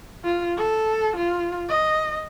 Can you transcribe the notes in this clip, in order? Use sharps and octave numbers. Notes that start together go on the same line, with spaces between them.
F4
A4
F4
D#5